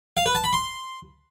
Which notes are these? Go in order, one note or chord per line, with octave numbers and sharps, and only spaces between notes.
F5
B4
A5
B5
C6